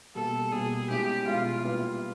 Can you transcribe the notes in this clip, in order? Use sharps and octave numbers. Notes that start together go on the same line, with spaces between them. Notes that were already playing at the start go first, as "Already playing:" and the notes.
B2 G3 A#3 A4
B2 G3 A#3 G#4
B2 G#3 C#4 E4 G4
B2 G#3 C#4 E4 F4
A#2 G3 B3 E4 G4